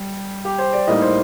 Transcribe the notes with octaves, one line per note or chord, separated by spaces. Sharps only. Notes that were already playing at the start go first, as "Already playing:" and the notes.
Already playing: G3
G4
C5
D5
A2 G3 A#3 D#4 D#5
C5